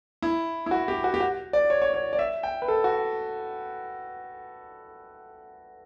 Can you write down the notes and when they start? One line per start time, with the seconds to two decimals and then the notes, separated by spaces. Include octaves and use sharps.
0.22 E4
0.66 E4
0.71 F#4
0.88 G4
1.04 F#4
1.14 G4
1.20 F#4
1.53 D5
1.70 C#5
1.82 C#5
1.94 C#5
2.13 D5
2.19 E5
2.43 G5
2.62 B4
2.68 A4
2.84 F#4